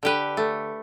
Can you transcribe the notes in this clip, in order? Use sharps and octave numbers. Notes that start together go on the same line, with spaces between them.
D3 G4 B4
A3